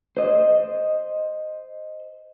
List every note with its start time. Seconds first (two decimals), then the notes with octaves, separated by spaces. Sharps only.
0.17 C5 D#5